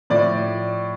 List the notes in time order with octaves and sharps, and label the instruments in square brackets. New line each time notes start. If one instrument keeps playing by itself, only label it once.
[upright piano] A2 F3 D5